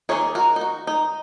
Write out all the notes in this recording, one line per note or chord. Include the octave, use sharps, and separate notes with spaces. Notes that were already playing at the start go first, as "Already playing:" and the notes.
D#3 A#3 D#4 G#4 C#5
F#4 A#4
D#4
F#4
D#4